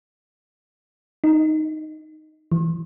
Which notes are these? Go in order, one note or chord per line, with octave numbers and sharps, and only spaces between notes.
D#4
E3